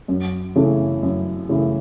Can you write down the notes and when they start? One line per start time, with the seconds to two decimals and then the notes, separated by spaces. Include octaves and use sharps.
0.08 F#2
0.56 C#3 E3 A3 E4
1.03 F#2
1.49 C#3 E3 A3 E4